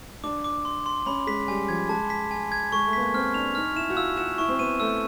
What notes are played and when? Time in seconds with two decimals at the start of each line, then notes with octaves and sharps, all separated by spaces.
0.24 D4 D6
0.44 D6
0.65 C6
0.86 C6
1.06 C#4 B5
1.27 G#3 B6
1.48 G3 G#5
1.69 F3 G#6
1.89 G#3 A5
2.10 B6
2.31 G#5
2.52 G#6
2.72 G#3 C#6
2.86 A3
2.93 B3 B6
3.00 A#3
3.14 C4 F6
3.34 D4 F7
3.55 D#4 F6
3.76 E4 E7
3.90 F#4
3.96 F4 E6
4.17 F#4 E7
4.38 E4 C#6
4.48 C4
4.59 B3 D#7
4.80 A3 E6